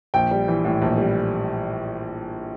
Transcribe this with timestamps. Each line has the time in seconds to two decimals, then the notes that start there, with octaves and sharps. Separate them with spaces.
0.14 A#1 G5
0.31 G3
0.48 E3
0.65 A2
0.82 A#1
0.98 G3